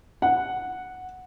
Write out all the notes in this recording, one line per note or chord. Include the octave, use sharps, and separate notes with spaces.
F#5